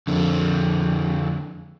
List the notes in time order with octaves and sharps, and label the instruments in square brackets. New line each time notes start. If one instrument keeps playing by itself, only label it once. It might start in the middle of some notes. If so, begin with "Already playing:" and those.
[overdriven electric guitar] F2 D3